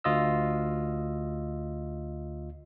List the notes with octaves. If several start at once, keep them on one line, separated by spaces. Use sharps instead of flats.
D2 F4 D#5 E6